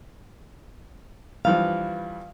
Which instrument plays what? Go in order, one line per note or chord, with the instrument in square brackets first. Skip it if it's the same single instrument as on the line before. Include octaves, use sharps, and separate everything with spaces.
[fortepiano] G2 E3 F3 [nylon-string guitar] F5